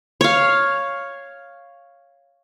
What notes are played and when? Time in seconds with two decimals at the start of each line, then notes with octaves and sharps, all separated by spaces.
0.21 C#5 F5